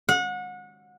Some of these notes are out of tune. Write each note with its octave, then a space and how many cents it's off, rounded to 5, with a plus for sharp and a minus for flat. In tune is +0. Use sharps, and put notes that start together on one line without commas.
F#5 -30